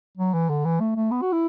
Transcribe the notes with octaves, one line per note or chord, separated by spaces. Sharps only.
F#3
E3
D3
E3
A3
A3
B3
F#4
E4